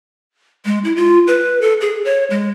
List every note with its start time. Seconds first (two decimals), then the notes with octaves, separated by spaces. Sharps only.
0.65 G#3
0.84 E4
0.96 F4
1.27 B4
1.61 A4
1.81 G#4
2.05 C#5
2.30 G#3